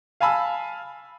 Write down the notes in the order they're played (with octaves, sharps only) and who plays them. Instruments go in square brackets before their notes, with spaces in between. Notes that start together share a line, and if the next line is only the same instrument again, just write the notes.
[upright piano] F5 G#5 A5 B5 E6